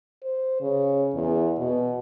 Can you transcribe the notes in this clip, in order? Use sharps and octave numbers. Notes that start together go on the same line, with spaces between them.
C5
C#3
E2
B2